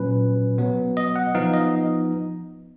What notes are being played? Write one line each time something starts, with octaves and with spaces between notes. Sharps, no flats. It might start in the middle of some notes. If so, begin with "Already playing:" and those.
Already playing: A#2 F#3 C#4 B4
B2 F#3 B3
D#5
F#5
F3 B3 D#4 F5
D#5